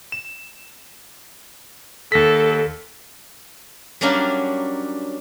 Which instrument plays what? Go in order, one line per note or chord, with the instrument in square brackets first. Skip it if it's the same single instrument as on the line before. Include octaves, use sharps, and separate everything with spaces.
[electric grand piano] E7
[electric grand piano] D#2 A#6 B6 [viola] A4
[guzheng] F#3 G3 A#3 C#4 D4